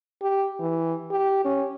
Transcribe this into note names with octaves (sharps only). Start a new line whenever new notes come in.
G4
E3
G4
C#4